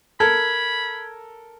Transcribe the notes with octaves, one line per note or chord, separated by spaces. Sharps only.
A4 A#4 B5 G#6